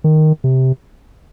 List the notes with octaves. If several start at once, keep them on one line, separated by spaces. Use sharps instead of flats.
D#3
C3